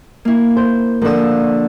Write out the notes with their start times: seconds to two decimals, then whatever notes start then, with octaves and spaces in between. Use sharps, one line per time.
0.25 A#3 E4
0.57 C5
1.02 D3 F3 A#3 F#5 E6